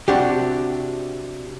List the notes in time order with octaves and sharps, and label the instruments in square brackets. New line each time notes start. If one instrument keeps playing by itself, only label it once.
[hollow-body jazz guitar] C3 D4 F#4 G4